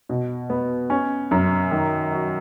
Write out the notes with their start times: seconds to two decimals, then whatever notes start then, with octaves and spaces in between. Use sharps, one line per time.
0.09 B2
0.50 B3
0.90 C#4
1.31 F#2
1.71 D#3
2.12 F#4